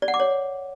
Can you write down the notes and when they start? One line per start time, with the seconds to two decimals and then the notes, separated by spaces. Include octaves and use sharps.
0.02 D5
0.08 F#5
0.14 D6
0.20 C#5